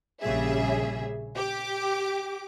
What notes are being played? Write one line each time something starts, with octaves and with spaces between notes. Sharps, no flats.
A#1 C#3 G3 G#4 E5
G4 D6